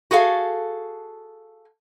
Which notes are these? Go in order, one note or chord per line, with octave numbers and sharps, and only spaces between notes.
F#4 G#4 A4 F5